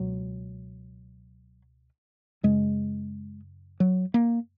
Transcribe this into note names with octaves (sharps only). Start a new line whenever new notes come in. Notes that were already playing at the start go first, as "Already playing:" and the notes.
Already playing: C#2 B2 F#3
F#2 C#3 G#3
F#3
A#3